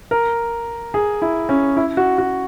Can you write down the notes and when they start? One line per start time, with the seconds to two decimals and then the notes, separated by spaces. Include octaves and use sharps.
0.11 A#4
0.94 G#4
1.22 E4
1.49 C#4
1.77 E4
1.97 F#4
2.18 F#4